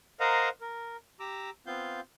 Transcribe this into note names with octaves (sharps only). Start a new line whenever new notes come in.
A#4 C5 D#5 F5 F#5 A#5
A#4
G4 A#5 D6 E6
B3 C4 F4 F5 G6